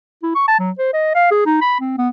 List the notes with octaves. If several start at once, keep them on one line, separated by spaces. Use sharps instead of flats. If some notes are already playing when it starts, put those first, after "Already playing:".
E4
C#6
A5
F#3
C5
D#5
F5
G#4
D#4
B5
C4
B3